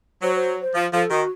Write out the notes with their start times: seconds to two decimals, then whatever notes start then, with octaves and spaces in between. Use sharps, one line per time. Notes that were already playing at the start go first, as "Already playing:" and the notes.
0.22 F#3 C5
0.36 C5
0.62 C5
0.75 F3
0.92 F3 A4
1.11 D#3 F#4